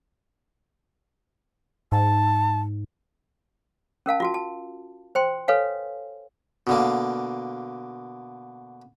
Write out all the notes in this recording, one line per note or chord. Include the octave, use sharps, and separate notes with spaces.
G#2 A5
C#4 A#4 F5 A5
F4 F#4 A5
A5
C5 G5 C6
A4 B4 C#5 F5 G#5
B2 D3 A#3